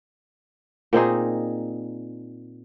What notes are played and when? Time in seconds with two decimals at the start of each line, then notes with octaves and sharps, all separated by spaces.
0.93 A#2 C4 D#4 G#4